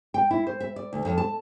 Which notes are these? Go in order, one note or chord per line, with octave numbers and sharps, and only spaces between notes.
G5
E4
C5
E5
D5
D2
F2
A5